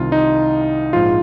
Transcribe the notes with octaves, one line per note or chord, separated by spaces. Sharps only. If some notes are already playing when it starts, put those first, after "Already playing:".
Already playing: C2 C3 D#3 F4
D#4
A#1 G#2 F3 F4